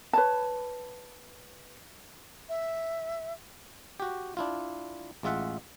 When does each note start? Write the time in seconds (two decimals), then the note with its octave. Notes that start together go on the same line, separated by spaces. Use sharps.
0.13 B4 C#5 A5
2.49 E5
4.00 F#4 G4
4.37 D4 E4 F4
5.23 A1 G#3 F4 E5 F#5